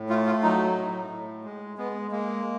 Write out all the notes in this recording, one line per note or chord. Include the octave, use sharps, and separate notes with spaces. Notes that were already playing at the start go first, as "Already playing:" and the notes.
Already playing: A2
A3 F4
F4
F#3 D#4
A2
A2
G#3
G#3 B3
G#3 A#3